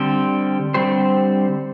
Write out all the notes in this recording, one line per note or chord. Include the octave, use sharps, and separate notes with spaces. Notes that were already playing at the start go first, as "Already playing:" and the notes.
Already playing: D3 G3 C4 G4 C5
D3 G3 C4 G4 C5